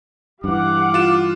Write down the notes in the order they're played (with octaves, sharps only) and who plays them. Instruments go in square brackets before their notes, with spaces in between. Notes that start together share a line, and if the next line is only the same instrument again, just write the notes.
[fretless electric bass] G2 E3 [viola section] G4 F5 F#5 [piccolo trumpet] D6
[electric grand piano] F4 E7